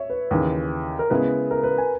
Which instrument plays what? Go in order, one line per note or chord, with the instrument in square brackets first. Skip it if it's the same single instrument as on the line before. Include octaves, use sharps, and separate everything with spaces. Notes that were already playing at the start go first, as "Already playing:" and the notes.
Already playing: [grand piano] C#5 E5
B4
[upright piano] D#2 C#3 E3
[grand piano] A#4
[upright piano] C#3 G#3 B3 E4 [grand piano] B4
[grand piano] A#4
B4
G#5